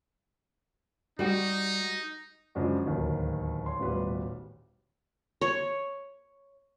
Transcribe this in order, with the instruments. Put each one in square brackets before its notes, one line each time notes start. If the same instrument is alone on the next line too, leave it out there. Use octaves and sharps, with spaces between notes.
[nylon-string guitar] G3 F#4 [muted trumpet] D#4
[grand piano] F#2 C#3 F3 G#3 D4 F#4
D1 D#2 D#3
C#5 C6
D#1 A1 B2 G3 B4 C6
[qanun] C#5